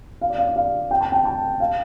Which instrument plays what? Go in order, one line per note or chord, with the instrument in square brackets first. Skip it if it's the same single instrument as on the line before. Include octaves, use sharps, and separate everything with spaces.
[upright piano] F5
D5
F5
D5
F5
G5
A5
G5
A5
F5